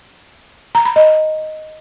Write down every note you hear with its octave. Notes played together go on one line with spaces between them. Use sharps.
A#5
B5
D#5